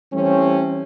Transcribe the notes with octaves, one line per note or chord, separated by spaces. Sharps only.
E3 G3 A3 C4 C#4